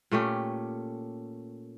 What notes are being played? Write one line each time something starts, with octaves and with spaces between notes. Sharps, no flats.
A#2 A3 C#4 G4